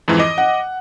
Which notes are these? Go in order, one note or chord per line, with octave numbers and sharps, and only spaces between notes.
F2 G#2 E3
D#5 D6
F#5